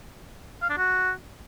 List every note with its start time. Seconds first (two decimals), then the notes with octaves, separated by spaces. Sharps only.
0.62 F5
0.70 D4
0.78 F#4